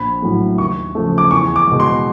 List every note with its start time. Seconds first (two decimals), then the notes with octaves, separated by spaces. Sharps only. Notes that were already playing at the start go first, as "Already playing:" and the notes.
Already playing: A#1 B5
0.22 A2 F#3 A3
0.58 D#2 C#6
0.95 C#3 F3 A3
1.18 D6
1.31 E2 C#6
1.56 D6
1.67 B2 G#3
1.80 C6